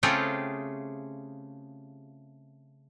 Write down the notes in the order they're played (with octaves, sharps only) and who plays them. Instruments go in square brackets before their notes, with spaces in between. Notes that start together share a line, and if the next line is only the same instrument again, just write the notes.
[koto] C#3 A3 C4 F4 G4 G#4